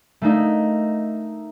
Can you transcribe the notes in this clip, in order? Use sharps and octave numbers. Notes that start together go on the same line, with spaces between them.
A3 A#3 D#4